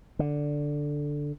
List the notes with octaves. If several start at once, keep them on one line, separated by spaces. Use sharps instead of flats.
D3